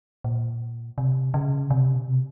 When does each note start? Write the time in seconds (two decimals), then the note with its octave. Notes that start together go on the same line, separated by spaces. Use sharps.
0.24 A#2
0.98 C3
1.34 C#3
1.71 C3
1.95 B2
2.08 C3